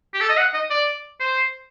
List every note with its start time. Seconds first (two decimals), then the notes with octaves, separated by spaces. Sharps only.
0.14 G4
0.21 A4
0.29 D#5
0.38 F#5
0.54 D#5
0.70 D5
1.20 C5